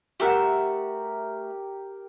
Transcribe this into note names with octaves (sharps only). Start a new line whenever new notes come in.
A3 G4 A#4 E5 F#5